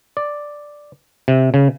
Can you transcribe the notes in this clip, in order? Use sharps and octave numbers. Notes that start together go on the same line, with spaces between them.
D5
C3
C#3